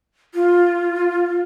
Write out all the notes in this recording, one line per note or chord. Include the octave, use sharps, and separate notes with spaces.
F4